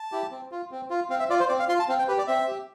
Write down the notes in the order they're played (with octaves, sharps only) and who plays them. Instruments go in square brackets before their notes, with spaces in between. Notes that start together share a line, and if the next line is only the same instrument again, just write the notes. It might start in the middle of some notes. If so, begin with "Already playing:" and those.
Already playing: [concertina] A5
E4 G4
C4
F4
C4
F4
C4 F5
E5
F4 D5
C5
C4 D5
F5
F4 C6
A5
C4 F5
G5
G4 B4
D5
C4 E5
G4